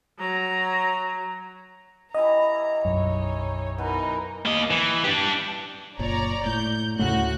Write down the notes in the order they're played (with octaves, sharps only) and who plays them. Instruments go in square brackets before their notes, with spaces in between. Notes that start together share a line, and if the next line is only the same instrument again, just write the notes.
[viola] F#3 A#5
[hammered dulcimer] E3 E4 G4 [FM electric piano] D#5 [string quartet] A#5
[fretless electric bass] B1 F#2 [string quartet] D#4 C#5
[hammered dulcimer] B2 E3 B4 [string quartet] D#4 A#4
[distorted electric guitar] A#3 D#5
E3
D4 G4
[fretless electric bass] F#1 A#2 [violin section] C#5 D5 A#5
[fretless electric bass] A2 [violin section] G6
[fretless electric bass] D2 C#3 A3 [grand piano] A2 [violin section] F#4 F#6